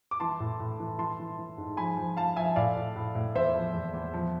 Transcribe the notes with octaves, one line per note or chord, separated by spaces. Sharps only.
D6
E3 A5 C6
A2
A2
E3
E3 A5 C6
E3
E3
G#2
F3 G#5 B5
F3
F3 F5 A5
F3 E5 G#5
A2 D5 F5
A2
A2
A2
E2 C5 E5
F3
E2
E2
F3